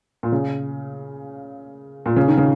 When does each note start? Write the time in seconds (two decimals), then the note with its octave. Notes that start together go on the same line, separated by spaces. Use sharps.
0.23 A#2
0.32 C#3
2.06 A#2
2.16 C#3
2.28 D#3
2.37 C#3